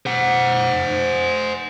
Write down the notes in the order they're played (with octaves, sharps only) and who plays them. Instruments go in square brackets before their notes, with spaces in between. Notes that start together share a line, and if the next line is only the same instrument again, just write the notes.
[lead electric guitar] C5 F#5